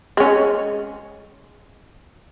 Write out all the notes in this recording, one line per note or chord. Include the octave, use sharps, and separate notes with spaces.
G#3 C#4